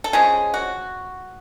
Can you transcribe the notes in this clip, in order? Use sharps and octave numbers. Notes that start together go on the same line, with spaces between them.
A4
C#3 F3 G#3 G#4
F#4